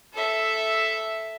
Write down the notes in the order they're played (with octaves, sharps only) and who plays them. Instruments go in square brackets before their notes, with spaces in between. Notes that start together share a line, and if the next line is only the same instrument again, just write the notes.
[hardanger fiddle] A4 E5